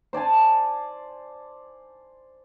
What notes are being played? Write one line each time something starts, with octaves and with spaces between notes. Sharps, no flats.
C5 D5 G#5 A5